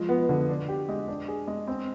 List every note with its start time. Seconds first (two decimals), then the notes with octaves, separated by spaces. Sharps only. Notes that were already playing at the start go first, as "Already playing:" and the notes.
Already playing: F3 G#3
0.09 B3
0.29 D3
0.49 D4
0.69 G4
0.89 G#3
1.08 D4
1.28 G#4
1.47 G#3
1.67 C4